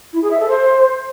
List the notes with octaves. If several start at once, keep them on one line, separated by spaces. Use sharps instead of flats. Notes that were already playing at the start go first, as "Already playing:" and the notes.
E4
G#4
E5
A4
C5